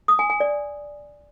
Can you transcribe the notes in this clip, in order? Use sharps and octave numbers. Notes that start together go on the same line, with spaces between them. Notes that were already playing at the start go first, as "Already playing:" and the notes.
D#6
G#5
G#5
D5